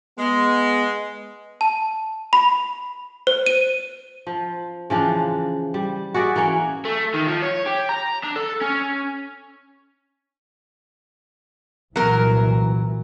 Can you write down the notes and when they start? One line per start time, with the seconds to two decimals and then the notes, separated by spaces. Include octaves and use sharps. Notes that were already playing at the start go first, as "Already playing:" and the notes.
0.18 G#3 B3
1.61 A5
2.33 B5
3.27 C5
3.46 D#7
4.27 F3
4.90 C#3 E3 F3 D4
5.74 G3
6.14 F#4 G#4 D5 E5
6.36 E3 A#3 C#4 C#5
6.85 A3
7.14 D#3
7.27 F3
7.42 C#5
7.66 G4
7.89 A#5
8.24 D4
8.36 A4
8.61 C#4
11.96 C2 A#2 E3 F#3 A#4